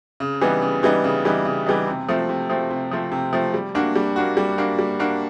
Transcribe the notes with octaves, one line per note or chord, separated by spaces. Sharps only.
C#3
E3 G3 B3 D#4
C#3
E3 G3 B3 D#4
C#3
E3 G3 B3 D#4
C#3
E3 G3 B3 D#4
C3
F3 A3 C4
C3
F3 A3 C4
C3
F3 A3 C4
C3
F3 A3 C4
G3
A#3 D4 F#4
G3
A#3 D4 F#4
G3
A#3 D4 F#4
G3
A#3 D4 F#4